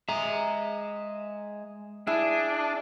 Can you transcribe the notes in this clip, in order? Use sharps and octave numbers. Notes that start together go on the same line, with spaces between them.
G#3 G#4 E5 A#5
D4 E4 G#4